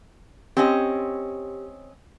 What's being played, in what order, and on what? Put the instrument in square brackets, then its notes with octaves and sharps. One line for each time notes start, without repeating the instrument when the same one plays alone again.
[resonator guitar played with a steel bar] C4 C#4 D#5 [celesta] G4